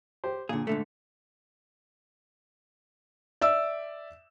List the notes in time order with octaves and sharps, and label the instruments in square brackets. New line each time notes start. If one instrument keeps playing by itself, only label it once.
[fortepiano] G4 C5
[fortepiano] A#2 [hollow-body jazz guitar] D3 G#4
[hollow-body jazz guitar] G#2 D3 A3
[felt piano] D5 E5 E6